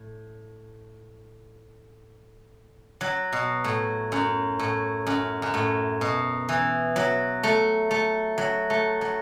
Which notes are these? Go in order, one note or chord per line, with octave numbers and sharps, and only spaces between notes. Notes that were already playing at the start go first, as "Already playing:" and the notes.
Already playing: A2
F#3
B2
A2
F#2
A2
F#2
F#2
A2
B2
E3
F#3
A3
A3
F#3
A3
F#3